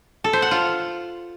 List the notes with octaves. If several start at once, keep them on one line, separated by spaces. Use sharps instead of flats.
A4
C5
F#5
F4